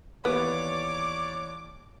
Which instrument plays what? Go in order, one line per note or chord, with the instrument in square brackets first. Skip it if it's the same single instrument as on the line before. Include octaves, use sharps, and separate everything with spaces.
[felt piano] D#2 E3 [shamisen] B3 [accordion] C#5 D5 [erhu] D6